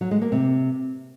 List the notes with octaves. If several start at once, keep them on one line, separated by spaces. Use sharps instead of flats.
F#3
G#3
A#3
C3